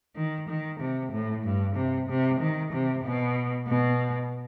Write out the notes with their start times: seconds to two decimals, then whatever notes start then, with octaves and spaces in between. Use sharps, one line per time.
0.16 D#3
0.48 D#3
0.80 C3
1.12 A2
1.44 G2
1.75 C3
2.09 C3
2.40 D#3
2.73 C3
3.04 B2
3.68 B2